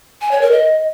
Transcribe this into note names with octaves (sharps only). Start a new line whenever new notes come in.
G#5
C#5
A#4
D#5